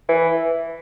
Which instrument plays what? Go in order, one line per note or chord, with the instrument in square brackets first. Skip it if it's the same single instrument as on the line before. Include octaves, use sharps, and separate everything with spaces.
[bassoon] E3